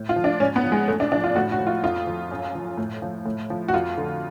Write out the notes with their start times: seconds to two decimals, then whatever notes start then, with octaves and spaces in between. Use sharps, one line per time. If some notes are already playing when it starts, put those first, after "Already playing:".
Already playing: A2
0.09 F4
0.16 F3
0.24 D4
0.40 G#2 C#4
0.56 B3
0.64 F3
0.72 G#3
0.88 F#2 A3
1.00 D4
1.12 F3 D4
1.24 F4
1.36 A2 F#4
1.52 F#4
1.59 F3
1.67 F4
1.83 F2 F4
2.07 F3
2.31 F#2
2.55 F3
2.78 A2
3.02 F3
3.26 A2
3.50 F3
3.68 F#4
3.73 F2 F4
3.97 D3 F3